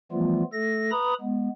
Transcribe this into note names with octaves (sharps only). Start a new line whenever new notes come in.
E3 F3 G3 A3 B3 F4
A3 A4 A#6
B4 A#5 B5 D#6
G#3 B3